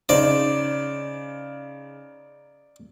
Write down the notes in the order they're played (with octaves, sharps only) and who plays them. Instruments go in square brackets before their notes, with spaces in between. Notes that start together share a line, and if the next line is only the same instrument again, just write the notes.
[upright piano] C#3 D#4 C5 [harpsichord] D5